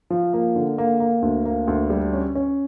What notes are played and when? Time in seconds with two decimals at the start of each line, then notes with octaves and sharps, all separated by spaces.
0.10 F3
0.33 A#3
0.55 D3
0.78 A#3
1.00 A#3
1.22 D2
1.45 A#3
1.67 D2
1.90 G3
2.13 C#4
2.35 C#4